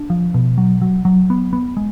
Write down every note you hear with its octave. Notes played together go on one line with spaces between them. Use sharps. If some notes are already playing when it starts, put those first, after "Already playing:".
Already playing: D4
F3
B2
F#3
F#3
F#3
B3
B3
G#3